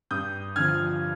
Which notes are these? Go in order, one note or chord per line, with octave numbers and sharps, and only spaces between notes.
G2 D#6 G6
D3 F3 F6 G#6